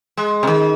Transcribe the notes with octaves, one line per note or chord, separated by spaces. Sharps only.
G#3
C3
D#3